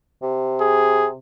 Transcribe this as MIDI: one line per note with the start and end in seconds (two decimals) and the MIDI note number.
0.22 1.19 48
0.61 1.09 68